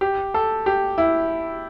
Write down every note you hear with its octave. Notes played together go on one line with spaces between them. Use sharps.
G4
A4
G4
E4